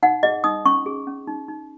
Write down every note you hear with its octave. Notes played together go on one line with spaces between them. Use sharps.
D#4 F#5
G#4 D#5
D#4 D#6
C#4 C#6
G#4
C#4
D#4
D#4